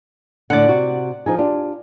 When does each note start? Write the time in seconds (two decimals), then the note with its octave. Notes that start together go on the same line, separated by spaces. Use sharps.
0.50 A2 D3 D5 F#5
0.69 C3 F#4
1.26 F3 D#4 G#4
1.38 D4 F4 G4